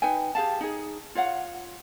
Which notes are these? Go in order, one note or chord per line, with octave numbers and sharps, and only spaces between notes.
D#4 B4 G5 G#5
G4 G#4 F5 A5
D#4 G#4
F4 C#5 F5 F#5